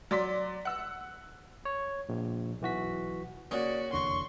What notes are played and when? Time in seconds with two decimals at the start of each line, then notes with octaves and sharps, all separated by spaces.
0.11 F#3 D5 C6 B6
0.65 F#5 E6
1.65 C#5
2.09 A#1
2.61 B1 E3 F#4 B6
3.51 C#3 A#3 F#4 G#4 D5
3.93 F1 E2 D3 C6 C#6